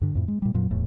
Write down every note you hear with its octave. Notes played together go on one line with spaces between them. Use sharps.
G2 D3
F2 A2
G#3
A#2 G3
F2 A#2 F#3
D1 E2 A2